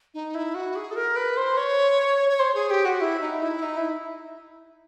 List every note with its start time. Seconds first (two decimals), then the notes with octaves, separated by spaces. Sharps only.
0.14 D#4
0.35 E4
0.55 F#4
0.76 G#4
0.91 A4
0.96 A#4
1.16 B4
1.37 C5
1.57 C#5
2.30 C#5
2.40 C5
2.54 G#4
2.71 G4
2.85 F#4
3.01 E4
3.21 D#4
3.42 E4
3.63 D#4
3.77 E4